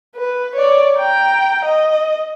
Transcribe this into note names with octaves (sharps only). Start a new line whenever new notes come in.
B4
C#5 D5
G5 A#5
D#5